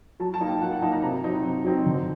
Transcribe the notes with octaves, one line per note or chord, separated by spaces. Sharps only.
F#3 A5
A5
A#3 D#4
G5
F#3 F#5
F#5
A#3 D#4 A5
A#5
C3 A#5
F#3 C4 D#4
C3
F#3 C4 D#4
D3